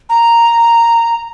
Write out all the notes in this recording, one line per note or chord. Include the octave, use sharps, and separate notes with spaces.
A#5